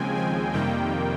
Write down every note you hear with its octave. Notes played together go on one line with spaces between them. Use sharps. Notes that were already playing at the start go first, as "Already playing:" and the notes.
Already playing: D#2 C#3 F3 G#3 C4 G5 G#5
G#5
F2 C3 D#3 G3 A#3 G5